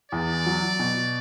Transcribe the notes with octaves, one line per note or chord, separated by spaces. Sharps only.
E2 D5
F#3
B2